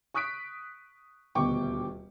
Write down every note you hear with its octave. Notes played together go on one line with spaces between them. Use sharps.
C#6 D#6 F#6 B6 D7
D#1 D2 B2 G5 C#6 D6